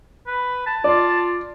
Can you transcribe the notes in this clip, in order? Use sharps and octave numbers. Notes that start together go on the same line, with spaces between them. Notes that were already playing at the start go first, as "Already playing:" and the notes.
B4
A5
F4 D5